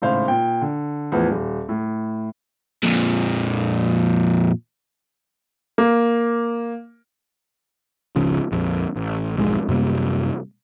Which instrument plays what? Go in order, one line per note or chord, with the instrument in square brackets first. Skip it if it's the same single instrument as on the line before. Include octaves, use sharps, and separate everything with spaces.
[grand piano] G#1 A2 C#3 C5 F5
A#2 G5
D3
E2 A2 E3 F3 B3
D#1
A2
[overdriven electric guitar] F2 A#2
[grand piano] A#3
[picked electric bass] G#1 C#2 C#3 F3
A#1 F2
A1
B1 F2 G#2 G#3
F#2 C3 G3 A#3